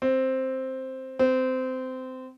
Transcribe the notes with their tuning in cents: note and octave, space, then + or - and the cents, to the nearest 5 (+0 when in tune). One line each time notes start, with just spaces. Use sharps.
C4 +5
C4 -20